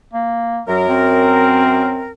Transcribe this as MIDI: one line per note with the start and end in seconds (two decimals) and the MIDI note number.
0.13 0.60 58
0.68 2.12 42
0.68 0.85 54
0.68 2.12 70
0.88 2.10 60